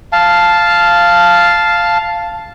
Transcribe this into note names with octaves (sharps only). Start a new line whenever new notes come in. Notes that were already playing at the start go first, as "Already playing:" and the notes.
F5 A5